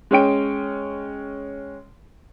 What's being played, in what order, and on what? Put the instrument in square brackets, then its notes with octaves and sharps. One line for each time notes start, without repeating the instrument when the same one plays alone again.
[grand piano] G#3 C#4 G5 D7